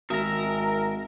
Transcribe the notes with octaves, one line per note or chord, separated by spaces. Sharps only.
G#1 F#4 A#4 E5 A#5